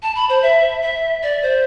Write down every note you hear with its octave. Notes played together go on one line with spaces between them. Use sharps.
A5
B5
C5
E5
E5
D5
C5